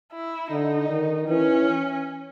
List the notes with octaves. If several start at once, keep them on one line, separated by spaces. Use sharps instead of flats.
E4
D3 D#4
D#3
E3 C#4